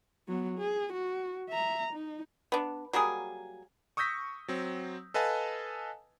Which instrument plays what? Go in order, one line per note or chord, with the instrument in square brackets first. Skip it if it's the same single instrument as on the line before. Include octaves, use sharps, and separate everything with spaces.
[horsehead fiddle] F#3 B3
G#4
F#4
E5 A#5
D#4
[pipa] B3 D4
F#3 G3 A#3 G#4
[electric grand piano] C#6 D#6 E6 G6 A#6 B6
F#3 C4
A4 B4 D#5 F5 G#5 A5